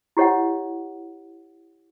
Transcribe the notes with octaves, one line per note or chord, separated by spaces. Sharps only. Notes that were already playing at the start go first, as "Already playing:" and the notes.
E4 G4 C#5 D#5 F#5